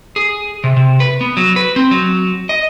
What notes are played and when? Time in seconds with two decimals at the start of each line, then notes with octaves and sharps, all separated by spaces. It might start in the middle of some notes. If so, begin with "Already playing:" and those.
0.16 G#4
0.64 C3
0.77 C3
1.00 B4
1.21 B3
1.37 F#3
1.56 B4
1.76 C4
1.91 F#3
2.49 D#5